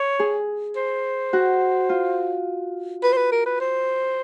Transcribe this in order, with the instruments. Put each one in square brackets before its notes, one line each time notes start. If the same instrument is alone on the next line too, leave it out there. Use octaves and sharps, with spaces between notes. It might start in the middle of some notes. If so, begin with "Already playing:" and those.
Already playing: [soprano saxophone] C#5
[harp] G#4
[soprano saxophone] C5
[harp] F#4
F4
[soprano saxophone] B4
C5
B4
A#4
B4
C5